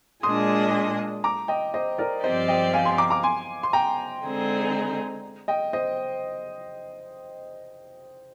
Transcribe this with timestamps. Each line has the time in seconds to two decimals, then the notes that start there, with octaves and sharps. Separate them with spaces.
0.23 A#2 G#3 D4 G#4 D#5 C6 D#6
1.24 A#5 D6
1.48 D#5 G5
1.74 C5 D#5
1.98 A#4 D5
2.23 G2 F3 C4 G4 C5 D5 D#5
2.48 D#5 G5
2.74 F5 G#5
2.85 G#5 C6
2.98 A#5 D6
3.10 A#5 D6
3.23 G#5 C6
3.63 C6
3.73 G5 A#5
4.24 D3 G#3 C4 D#4 G#4
5.48 D#5 G5
5.73 C5 D#5